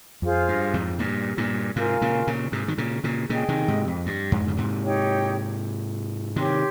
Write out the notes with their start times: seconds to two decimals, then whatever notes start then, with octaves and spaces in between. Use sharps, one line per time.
0.22 F2 F4 G#4 C5 F5
0.48 G2
0.74 F2 G#2
0.99 G2 A#2
1.37 G2 A#2
1.76 G#2 C3 F4 A#4 F5 G#5
2.01 A#2 C#3
2.27 A#2 C#3
2.52 G#2 C3
2.68 D#3
2.78 A#2 C#3
3.04 A#2 C#3
3.29 A#2 C#3 G#4 D#5 G5
3.49 C3 D#3
3.68 G#2 C3
3.88 F2
4.06 G2
4.32 F2 G#2
4.48 C#3
4.57 G#2 C3
4.83 D#4 G4 C#5 G5
6.36 C3 D#3 G4 C#5 G5 C6